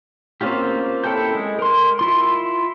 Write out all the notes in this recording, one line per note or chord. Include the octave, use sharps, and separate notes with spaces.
A#3 C4 C#4 F4 G4
E4 A4 G5 A5 G6
G#3
A#4 C6
E4 F4 C6